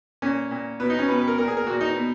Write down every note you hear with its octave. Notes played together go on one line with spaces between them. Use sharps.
A#2 C#4
A#2
B2 B3
D#4
C#4
B2 B4
B4
A#4
A#2 A#4
G#4
A#4
A#2 F#4
D#4
B2